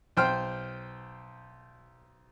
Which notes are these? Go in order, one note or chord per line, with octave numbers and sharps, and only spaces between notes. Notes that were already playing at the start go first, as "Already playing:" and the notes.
B1 C5 G5 C6 F6